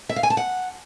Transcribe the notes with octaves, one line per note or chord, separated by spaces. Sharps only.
E5
F5
G#5
A5
F#5